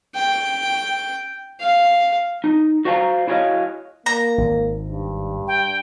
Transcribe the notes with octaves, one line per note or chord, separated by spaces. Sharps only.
G5
F5
D#4
F#4 C5 D5 F5 G#5 A#5
E4 F#4 G#4 C#5 D#5 F5
A#3 A#5
G#1
G2
G5